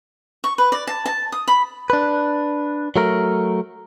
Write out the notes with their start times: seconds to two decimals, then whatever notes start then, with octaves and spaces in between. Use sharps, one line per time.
0.44 C#6
0.58 B4
0.72 D5
0.87 A5
1.06 A5
1.32 D#6
1.48 B5
1.90 D4 B4
2.96 F#3 A3 A#4